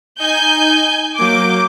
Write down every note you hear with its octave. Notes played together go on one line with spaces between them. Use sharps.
D#4 G#5 G6
F#3 A#3 D6 G6